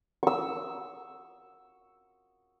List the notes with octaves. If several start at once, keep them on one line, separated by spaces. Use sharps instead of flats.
C#6 E6